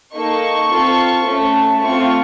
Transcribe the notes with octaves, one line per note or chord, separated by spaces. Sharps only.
A#3 D#4 A4 C#6
C4 F4 A4
A3 C#4 A4
A3 C4 F4 C#6